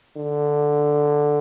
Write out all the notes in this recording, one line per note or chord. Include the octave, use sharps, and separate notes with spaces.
D3